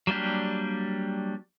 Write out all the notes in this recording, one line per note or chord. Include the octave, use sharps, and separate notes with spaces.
F#3 G3 A#3 D4 G4